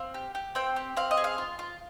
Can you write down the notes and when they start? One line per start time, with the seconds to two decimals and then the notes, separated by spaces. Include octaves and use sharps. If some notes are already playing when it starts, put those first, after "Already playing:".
Already playing: C4 F5
0.14 G4
0.35 G4
0.55 C4 G5
0.76 G4
0.97 C4 F5
1.11 D#5
1.17 G#4
1.24 F5
1.38 F4
1.59 F4